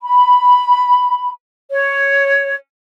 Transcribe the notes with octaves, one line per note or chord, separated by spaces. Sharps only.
B5
C#5